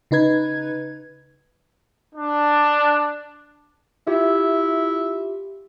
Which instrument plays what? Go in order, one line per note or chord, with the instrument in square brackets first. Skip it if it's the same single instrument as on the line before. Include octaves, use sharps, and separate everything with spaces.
[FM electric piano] C#3 D#4 B4 G#6
[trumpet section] D4
[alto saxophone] E4 [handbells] F4 G4 E5